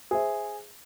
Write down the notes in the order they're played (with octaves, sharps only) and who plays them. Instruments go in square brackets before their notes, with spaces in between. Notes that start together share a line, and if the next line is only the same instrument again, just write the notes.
[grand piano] G#4 C5 E5